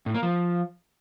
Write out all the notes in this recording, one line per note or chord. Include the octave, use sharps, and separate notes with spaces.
A2
A#3
F3